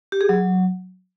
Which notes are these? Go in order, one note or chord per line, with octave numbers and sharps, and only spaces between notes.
G4
G#4
F#3